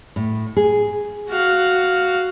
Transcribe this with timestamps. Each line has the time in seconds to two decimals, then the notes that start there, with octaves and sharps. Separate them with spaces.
0.16 A2
0.57 G#4
1.30 F#4 F5